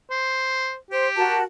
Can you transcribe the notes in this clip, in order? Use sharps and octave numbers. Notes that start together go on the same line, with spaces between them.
C5
G4 C5
F#4 A#4 A5